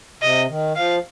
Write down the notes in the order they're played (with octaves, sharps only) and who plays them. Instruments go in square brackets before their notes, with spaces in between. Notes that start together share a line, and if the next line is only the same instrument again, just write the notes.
[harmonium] C3 [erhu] D#5
[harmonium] D#3
[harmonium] F3 [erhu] F5